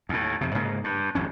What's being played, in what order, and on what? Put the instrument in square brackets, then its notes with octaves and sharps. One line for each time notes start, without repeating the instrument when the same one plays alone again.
[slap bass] D#2 A2
F2 C3
G#2 C#3 A#3
G2
G#1 F2 C#4